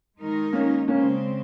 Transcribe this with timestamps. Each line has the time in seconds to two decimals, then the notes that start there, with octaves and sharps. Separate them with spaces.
0.19 D#3 G#3 D#4 A#4
0.53 A#3 C#4
0.88 C#3 G#3 A#3 C4 C#4